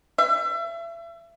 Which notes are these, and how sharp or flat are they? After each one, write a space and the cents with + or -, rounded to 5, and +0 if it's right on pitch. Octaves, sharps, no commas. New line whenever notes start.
E5 +35